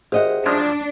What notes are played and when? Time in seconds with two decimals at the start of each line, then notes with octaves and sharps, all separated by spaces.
0.12 G#1 G4 G#4 C5 D#5 E5 F#5
0.46 F3 F#3 G#3 D4